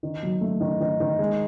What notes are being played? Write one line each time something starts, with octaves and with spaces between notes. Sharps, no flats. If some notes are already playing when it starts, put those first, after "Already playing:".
D#3
F#3
A3
D#3
D#3
D#3
G#3